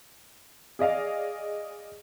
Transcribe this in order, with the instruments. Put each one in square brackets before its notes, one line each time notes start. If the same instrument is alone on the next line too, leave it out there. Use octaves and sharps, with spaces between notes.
[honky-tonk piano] G#4 D5 D#5 F5